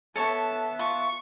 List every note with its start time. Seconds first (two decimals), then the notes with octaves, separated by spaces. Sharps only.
0.16 B3 A4 C#5 E5 A5 C#6
0.79 F4 C#6